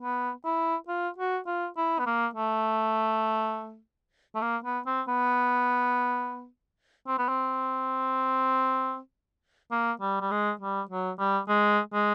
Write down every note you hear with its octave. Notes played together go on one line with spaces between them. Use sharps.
B3
E4
F4
F#4
F4
E4
B3
A#3
A3
A3
A#3
B3
C4
B3
C4
B3
C4
A#3
G3
G3
G#3
G3
F#3
G3
G#3
G#3